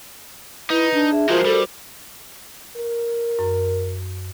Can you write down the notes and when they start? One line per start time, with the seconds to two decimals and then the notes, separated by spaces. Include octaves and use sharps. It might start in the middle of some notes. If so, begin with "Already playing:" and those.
0.70 D#4 E4 B4
0.93 D4
1.11 G#4 E5
1.29 F3 G#3 D#4 F4 F#4 A#4 C5
1.45 G3 A4
2.76 A#4
3.39 F#2